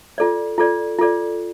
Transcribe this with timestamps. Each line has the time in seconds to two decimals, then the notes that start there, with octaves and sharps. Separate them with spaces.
0.18 F4 A4 D5
0.58 F4 A4 D5
0.99 F4 A4 D5